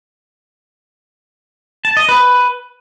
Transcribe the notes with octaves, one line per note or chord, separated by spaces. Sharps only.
A5
D#5
B4